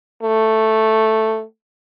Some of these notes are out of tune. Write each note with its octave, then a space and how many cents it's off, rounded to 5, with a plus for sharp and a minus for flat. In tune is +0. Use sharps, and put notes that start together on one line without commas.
A3 +0